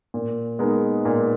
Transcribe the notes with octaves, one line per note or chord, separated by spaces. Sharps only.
A#2
G#3 B3 D#4 A#4
A#2